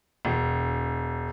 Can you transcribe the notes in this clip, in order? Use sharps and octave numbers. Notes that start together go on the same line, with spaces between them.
E1